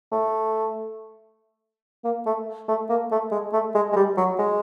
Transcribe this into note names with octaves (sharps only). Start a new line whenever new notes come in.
A3
A#3
A3
A3
A#3
A3
G#3
A3
G#3
G#3
G3
F#3
G#3